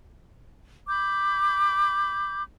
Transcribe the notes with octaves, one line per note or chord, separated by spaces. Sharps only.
B5 D6 G6